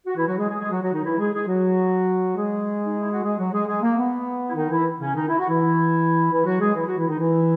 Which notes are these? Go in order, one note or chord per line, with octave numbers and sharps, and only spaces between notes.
F#4
E3 E4
F#3 F#4
G#3 G#4
G#3 G#4
G#3 G#4
F#3 F#4
F#3 F#4
D#3 D#4
E3 E4
G#3 G#4
G#3 G#4
F#3 F#4
G#3 G#4
D#4
E4
F#4
G#3 G#4
F#3 F#4
G#3 G#4
G#3 G#4
A#3
B3
E4
D#3 D#4
E3 E4
C#3 C#4
D#3 D#4
E4
F#4
E3 E4
E3 E4
F#3 F#4
G#3 G#4
E3 E4
F#3 F#4
E3 E4
D#3 D#4
E3 E4